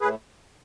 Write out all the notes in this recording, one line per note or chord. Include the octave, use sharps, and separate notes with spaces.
A2 G#4 B4